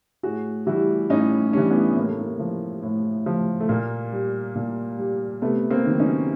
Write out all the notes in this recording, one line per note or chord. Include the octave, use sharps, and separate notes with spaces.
A2 F#4 G#4
E3 G3 E4 F#4
A2 C#4 D#4
E3 G3 C#4 D4
B3 C#4
A2 A#3
A3
A#3
F3
A2
F3
A3
A#2 A#3
G3
A#2
G3
C3 A3 B3
A#3 C4
D#3 F#3
C#4 D#4